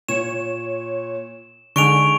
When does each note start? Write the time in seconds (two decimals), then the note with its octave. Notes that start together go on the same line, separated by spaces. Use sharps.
0.09 A#2 C#5 E7
1.76 D3 G#3 D#4 G#5 C#6 D7 F7